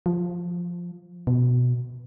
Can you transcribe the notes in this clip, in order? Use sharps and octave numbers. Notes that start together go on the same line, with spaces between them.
F3
B2